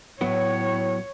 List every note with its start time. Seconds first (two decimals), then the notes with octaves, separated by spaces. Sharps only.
0.21 A2 F#3 B3 E4 C#5